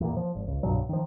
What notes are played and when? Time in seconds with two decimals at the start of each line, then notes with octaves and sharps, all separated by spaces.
0.01 E2 A#2
0.17 F3
0.35 G#1
0.47 C#2
0.63 C2 G2 B2 F#3
0.89 D#3 F3